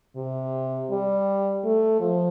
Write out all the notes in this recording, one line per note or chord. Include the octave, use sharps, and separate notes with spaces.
C3
G3
A3
F3